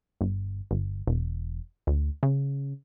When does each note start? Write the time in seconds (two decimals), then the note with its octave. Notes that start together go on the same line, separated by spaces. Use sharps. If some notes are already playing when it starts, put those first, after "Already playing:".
0.21 G1
0.71 G1
1.07 E1
1.87 D2
2.23 C#3